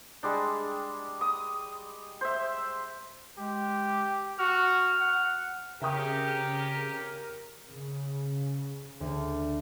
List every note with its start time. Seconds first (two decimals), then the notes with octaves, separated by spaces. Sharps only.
0.23 G3 G#3 D4
1.21 D#6
2.21 C5 E5
3.38 G#3 G4
4.39 F#4 F6
5.00 F#5
5.82 F2 C#3 C#4 G4 A#4 E5 G5 D#6
7.69 C#3
9.00 D2